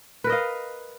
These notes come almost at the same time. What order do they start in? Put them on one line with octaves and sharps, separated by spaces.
B4 A#4 D#5 F5